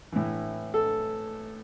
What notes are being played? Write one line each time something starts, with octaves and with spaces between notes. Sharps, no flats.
A2 E3
A4